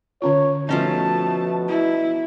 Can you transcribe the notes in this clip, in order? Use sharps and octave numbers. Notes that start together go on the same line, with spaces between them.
D3 C#4 F4 C#5
B2 F3 A3 C#4 D#4 F4 A5
E4